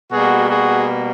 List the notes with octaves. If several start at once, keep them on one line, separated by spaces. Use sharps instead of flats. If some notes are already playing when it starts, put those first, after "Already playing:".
B2 G3 A#3 F#4 G#4
F#4 G#4